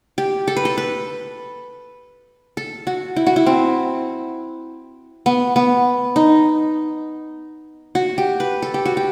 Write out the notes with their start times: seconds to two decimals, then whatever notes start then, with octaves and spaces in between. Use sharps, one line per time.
0.18 G4
0.48 A4
0.57 B4
0.65 A4
0.78 B4
2.57 A4
2.87 F#4
3.16 E4
3.27 F#4
3.36 E4
3.46 C4
5.26 B3
5.56 B3
6.16 D#4
7.95 F#4
8.18 G4
8.40 B4
8.62 A4
8.74 G4
8.85 F#4
8.97 G4